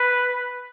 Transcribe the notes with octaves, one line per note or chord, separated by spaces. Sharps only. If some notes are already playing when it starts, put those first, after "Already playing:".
Already playing: B4